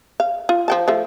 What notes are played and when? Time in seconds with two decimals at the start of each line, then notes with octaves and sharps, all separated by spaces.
0.20 F5
0.49 F4
0.68 F3 G5 A5
0.88 F3 A3